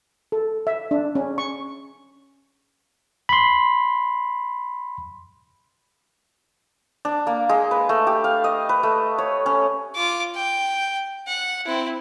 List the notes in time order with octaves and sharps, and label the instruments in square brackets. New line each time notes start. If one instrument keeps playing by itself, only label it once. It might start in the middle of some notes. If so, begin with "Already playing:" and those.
[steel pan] A4
E5
D4
C#4
C#6
[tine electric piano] B5 C6
[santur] D4
A#3
G#3
B4
A3
G4
F5
D#5
B4
A3
C#5
C#4
[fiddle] F4 D6
G5
F#5
C4 E4